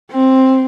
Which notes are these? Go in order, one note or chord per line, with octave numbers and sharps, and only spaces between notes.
C4